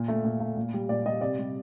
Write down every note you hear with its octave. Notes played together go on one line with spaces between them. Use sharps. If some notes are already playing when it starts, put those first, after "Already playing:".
Already playing: A#2
A3
A#2
A3
A#2
G3
A#2 D5
G3 D#5
C3 D5
G3